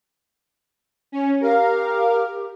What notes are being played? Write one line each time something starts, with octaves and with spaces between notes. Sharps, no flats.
C#4
G4 A#4 F5